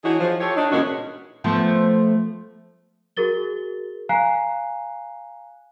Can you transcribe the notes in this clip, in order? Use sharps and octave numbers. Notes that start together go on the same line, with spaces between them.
E3 D4 D#4 F#4 G#4 C#5
F3
F4 G4 A4 C#5
D4 D#4
A#2 C#3 E3 G#3 C#4 F#4
F3 A3 B3
F#4 G#4 A#4 A6 G7
F5 G#5 A#5 F#6 C7